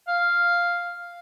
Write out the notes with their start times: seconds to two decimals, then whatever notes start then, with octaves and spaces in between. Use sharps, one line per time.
0.08 F5